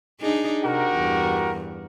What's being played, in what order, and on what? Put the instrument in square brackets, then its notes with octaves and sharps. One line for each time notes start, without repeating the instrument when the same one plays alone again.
[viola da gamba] D4 D#4 G#4
[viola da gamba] C3 [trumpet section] F#4 G4 A#4
[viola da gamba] E2 G2